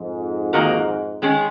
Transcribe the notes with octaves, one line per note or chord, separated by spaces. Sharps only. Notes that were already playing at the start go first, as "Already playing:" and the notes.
Already playing: F2 G#2
D#3 A#3 D#4 F#4 A#4
D#3 G#3 C#4 G#4